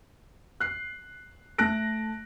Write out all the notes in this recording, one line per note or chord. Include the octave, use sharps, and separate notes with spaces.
F#6 C7
A3 A5 F#6 A#6 D7